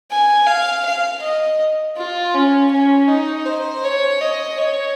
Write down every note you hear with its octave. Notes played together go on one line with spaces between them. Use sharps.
G#5
F5
F5
D#5
F4
C#4
C#4
D#4
C5
C#5
D#5
C#5